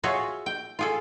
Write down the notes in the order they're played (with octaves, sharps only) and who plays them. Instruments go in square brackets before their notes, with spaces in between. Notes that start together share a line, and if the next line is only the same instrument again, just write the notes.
[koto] F4 F#4 G#4 C#5 E5
G5
F4 G#4 A4